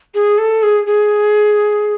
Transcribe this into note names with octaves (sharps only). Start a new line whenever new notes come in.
G#4
A4
G#4
G#4